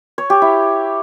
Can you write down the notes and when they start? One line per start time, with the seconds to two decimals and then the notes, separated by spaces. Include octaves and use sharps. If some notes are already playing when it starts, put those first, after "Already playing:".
0.18 C#5
0.30 G4
0.42 E4